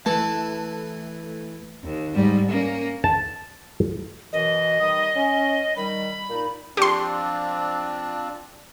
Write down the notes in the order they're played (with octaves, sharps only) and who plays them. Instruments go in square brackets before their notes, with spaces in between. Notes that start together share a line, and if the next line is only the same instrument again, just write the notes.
[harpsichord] E3 [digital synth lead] A3 [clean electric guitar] A5
[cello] D#2
G#2 G3
A#3 C#4
[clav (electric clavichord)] A5
[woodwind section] F#2 B2 E3 [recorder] D#5
[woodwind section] D#3 G3 D#6
C#4
[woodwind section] D#3 G3 [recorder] B5
[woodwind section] A#2 D#4
[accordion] F3 C4 D4 [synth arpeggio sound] G4 C6